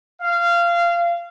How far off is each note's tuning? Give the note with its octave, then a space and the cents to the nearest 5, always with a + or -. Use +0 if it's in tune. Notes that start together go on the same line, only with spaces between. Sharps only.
F5 -20